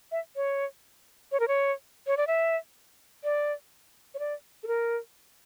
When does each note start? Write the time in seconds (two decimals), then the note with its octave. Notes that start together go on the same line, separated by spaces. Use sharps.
0.12 E5
0.36 C#5
1.32 C#5
1.40 A#4
1.48 C#5
2.07 C#5
2.17 D5
2.27 E5
3.24 D5
4.14 C#5
4.19 D5
4.63 A4
4.67 A#4